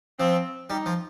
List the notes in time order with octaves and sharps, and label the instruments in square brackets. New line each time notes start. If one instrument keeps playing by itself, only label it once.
[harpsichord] F3 [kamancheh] C4
[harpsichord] G3 [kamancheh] D#4
[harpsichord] F3